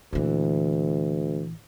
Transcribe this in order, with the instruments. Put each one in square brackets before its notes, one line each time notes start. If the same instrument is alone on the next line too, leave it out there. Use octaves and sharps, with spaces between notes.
[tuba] D2 [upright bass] A#2 E3